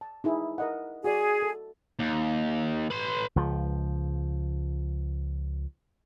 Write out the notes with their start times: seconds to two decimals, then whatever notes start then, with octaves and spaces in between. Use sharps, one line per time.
0.01 A5
0.24 D#4 E4 G#4
0.58 A#4 D#5 F#5
1.04 F#4 G#4 D5
1.42 A4
1.99 D#2
2.90 B4 C6
3.36 C#2 F3